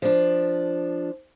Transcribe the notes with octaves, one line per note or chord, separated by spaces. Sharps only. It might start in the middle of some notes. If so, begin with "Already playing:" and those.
F3 D4